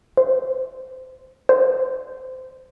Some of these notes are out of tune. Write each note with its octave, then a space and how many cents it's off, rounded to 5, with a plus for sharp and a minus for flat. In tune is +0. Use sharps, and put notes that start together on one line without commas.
C5 -15
C5 -20